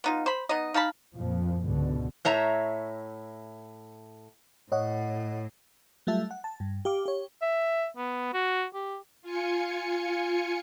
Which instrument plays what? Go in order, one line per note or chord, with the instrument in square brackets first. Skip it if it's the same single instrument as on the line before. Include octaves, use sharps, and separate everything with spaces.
[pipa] B3 D#4 F4
C5 B5
B3 D#4 D#5
D#4 F5 A5 B5
[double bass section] F2 A#2 F3
C#2 G#2 B2 D3
[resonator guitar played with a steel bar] A2 C#5 E5 A#5
[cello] A2 [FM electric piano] C#5 D#5 F#5
[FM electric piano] F#3 G3 A3 F4 E5 A5
F#5
A5
G2
G4 F5 D6
G4 C#5
[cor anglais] E5
B3
F#4
G4
[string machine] F4 G#5 C#7